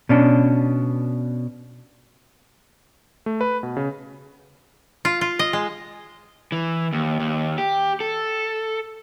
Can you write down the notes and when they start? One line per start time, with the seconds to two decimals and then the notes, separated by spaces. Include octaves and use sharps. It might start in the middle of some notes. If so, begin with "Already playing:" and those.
0.09 B2 C#4 D4
3.26 A3
3.41 B4
3.63 B2
3.77 C#3
5.05 F4
5.21 F4
5.39 D#5
5.53 G#3
6.52 E3
6.93 D#2
7.19 D#2
7.58 G4
8.00 A4